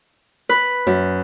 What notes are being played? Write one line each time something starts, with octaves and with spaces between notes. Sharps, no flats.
B4
F#2